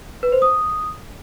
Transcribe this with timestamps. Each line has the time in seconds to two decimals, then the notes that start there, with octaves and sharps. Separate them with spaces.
0.23 B4
0.32 C5
0.42 D#6